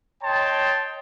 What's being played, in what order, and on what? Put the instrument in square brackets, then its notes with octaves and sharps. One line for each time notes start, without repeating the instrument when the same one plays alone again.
[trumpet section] C#5 D#5 G5 A5 C6